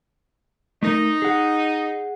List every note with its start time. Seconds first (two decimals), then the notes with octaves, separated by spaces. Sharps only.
0.83 A3 D#4 A#4
1.22 G#4 F#5